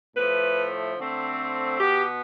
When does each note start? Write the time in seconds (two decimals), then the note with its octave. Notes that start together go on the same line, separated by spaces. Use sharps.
0.17 A2 F3 A3 B4
0.97 D3 A3 C4
1.80 B2 B3 G4